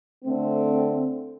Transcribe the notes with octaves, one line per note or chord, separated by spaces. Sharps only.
D3 A3 C4